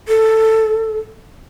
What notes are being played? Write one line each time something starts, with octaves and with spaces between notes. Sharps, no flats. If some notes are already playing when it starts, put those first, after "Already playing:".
A4